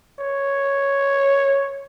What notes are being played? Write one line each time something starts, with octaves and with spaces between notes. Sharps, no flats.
C#5